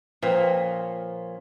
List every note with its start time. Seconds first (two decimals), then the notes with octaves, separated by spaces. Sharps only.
0.23 A#2 F3 C#4 B4 G5